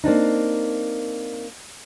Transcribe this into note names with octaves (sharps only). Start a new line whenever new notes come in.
A#3 C4 D4 D#4